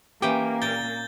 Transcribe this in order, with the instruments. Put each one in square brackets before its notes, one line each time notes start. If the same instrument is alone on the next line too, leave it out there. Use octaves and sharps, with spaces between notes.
[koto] E3 C#4 G5 [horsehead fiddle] A#3 [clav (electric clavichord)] G4
[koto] A#2 A#4 [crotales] G6 A6 G7